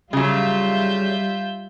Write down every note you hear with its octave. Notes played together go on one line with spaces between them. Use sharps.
C#3 F#3 G3 F4 E5 G6